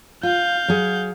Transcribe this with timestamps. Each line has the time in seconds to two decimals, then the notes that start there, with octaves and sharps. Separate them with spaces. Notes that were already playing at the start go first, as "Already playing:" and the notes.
0.23 F4 F5 G6
0.68 F#3 G#4 F#5